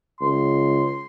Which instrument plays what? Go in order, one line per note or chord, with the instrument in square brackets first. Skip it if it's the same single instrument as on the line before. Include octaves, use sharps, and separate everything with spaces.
[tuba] C#2 [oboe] C6